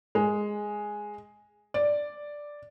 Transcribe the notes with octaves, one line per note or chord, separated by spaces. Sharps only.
G#3
D5